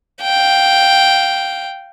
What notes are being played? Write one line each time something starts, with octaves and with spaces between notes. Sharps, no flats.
F5 G5